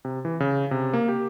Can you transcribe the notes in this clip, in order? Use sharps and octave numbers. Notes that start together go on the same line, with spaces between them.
C3
E3
C#3
C3
A#3
G4